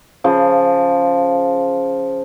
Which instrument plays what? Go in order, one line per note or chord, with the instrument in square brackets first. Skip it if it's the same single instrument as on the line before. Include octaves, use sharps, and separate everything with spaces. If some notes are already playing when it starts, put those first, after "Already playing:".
[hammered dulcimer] C#3 F3